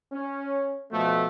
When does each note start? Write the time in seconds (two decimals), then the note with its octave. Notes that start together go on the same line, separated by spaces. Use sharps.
0.12 C#4
0.91 B2 F3 A3